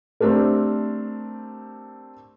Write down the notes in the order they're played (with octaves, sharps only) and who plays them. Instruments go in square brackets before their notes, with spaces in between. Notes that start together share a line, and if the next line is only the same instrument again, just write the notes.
[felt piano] A3 C4 D4 G4 A#4